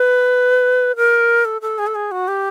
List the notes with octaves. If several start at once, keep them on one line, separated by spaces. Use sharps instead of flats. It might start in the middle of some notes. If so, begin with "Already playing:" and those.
Already playing: B4
A#4
A4
A4
G#4
A4
G#4
F#4
G4